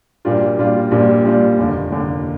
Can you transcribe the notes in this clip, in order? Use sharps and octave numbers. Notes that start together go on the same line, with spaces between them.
A#1 A#2 G3 D4 F4
A#1 A#2 G3 D4 F4
A#1 A#2 G3 D4 F4
A#1 A#2 G3 D4 F4
F1 D#2 D3
F1 D#2 D3